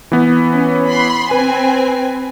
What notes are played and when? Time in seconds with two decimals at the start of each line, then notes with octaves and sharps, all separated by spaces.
0.12 E3 B3
0.54 C#4
0.87 B5 C6
1.31 C4 B4 G#5